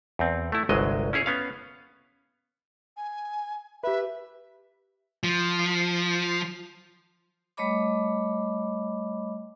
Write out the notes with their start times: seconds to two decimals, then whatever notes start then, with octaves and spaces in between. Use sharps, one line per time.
0.19 E2 C4
0.52 A3 E4
0.69 G1 C2 F#3 G#3 D#5
1.13 C#4 E4 G#4 C#5
1.26 B3 C#4 F5
2.97 G#5
3.83 G4 B4 E5
5.24 F3
7.57 G3 A3 C#5 D#5 B5 D6